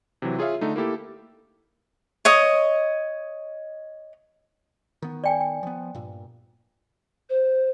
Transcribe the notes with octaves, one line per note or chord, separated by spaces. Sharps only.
C3 E3 F#3
F4 G#4 C#5 E5 F5
D3 A3 D#4
A#3 E4 G4 A4
C#5 D#5 D#6
D#3 B3
D5 G5 G#5
G5
F3 B3
G2 A#2
C5